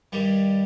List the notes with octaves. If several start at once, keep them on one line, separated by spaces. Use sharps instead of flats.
G2 D#3 G3